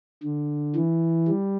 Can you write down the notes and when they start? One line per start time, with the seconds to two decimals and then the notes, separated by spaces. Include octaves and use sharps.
0.24 D3
0.76 E3
1.28 G3